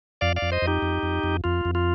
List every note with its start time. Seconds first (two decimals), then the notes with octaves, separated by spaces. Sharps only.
0.21 F2 D5 F5
0.36 D5 F5
0.42 F2
0.52 C5 D#5
0.62 F2
0.67 D#4 G4
0.82 F2
1.03 F2
1.23 F2
1.44 F2 F4
1.65 F2
1.75 F4